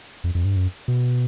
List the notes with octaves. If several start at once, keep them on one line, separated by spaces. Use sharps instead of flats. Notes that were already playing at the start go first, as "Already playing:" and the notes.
F2
F2
G2
F#2
B2